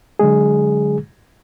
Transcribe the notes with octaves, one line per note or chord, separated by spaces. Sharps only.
D3 F#3 G#3 G#4